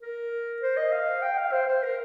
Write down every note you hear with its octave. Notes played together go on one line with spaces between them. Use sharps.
A#4
C5
D#5
F5
G5
F5
C5
C5
A#4